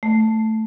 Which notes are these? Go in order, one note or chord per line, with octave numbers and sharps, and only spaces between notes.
A3